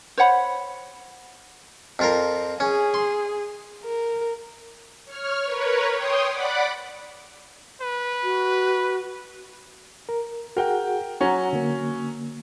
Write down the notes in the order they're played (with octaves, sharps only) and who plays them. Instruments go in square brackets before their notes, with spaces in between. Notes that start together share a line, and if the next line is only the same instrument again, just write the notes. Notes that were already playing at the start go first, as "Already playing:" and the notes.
[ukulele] C5 C#5 F#5 B5
[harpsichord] F2 F4 A#4
[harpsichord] C#4 [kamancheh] G#4
[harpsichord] C6
[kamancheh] A#4
[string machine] C#5 F6
A#4 B4 C#5
C#5 G5 C6 D#6
D5 F#5 B5 D6
[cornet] B4
[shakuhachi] F#4
[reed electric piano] A#4
[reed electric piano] F#4 G#4 F#5 [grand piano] A#4 G5
[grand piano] F#3 C#4 [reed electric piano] F#5 A#5
[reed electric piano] D3 A#3